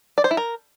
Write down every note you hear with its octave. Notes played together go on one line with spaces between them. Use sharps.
D5
C5
E4
A#4